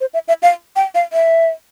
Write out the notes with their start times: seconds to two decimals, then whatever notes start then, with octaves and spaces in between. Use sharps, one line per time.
0.01 C5
0.14 E5
0.28 E5
0.42 F5
0.76 G5
0.95 F5
1.13 E5